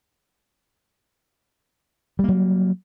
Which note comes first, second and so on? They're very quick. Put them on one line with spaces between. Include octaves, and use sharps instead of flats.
G3 A#3 F#3